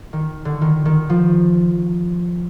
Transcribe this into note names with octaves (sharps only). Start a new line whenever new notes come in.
D#3
D3
D#3
D#3
F3